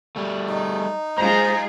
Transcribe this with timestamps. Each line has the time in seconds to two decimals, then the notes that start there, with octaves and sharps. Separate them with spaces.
0.16 G3 A3
0.49 D#4
1.18 G#3 F4 G#4 C5 A#5